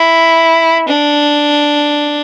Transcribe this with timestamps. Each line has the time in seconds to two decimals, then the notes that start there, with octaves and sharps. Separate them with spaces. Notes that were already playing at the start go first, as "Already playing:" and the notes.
Already playing: E4
0.88 D4